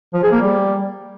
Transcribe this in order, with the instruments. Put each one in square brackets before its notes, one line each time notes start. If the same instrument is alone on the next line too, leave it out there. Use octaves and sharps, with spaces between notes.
[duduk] F3
G#4
A#3
G3